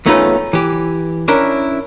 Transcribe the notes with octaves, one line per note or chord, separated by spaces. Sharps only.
E2 A3 C#4 D#4 F4 B4
E3 G4
C#4 D4 E4 A#4